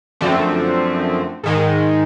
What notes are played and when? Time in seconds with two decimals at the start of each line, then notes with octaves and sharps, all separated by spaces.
0.21 F#2 D3 F3 A3 C4
1.43 G#2 D#3 G#3